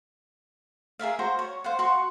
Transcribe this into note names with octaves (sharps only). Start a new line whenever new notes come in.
G#4 A#4 E5 F5
F#4 C5 A#5
C#5
C5 F5 F#5
F#4 C6 C#6